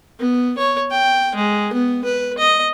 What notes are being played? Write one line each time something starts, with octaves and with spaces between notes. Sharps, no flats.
B3
C#5
G5
G#3
B3
B4
D#5